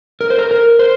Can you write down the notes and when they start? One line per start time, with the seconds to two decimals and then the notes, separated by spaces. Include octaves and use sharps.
0.21 A#4
0.30 C5
0.38 A#4
0.51 A#4
0.79 C5